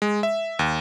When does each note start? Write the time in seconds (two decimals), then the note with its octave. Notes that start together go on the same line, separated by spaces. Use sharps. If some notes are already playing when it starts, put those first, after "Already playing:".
0.02 G#3
0.23 E5
0.59 D#2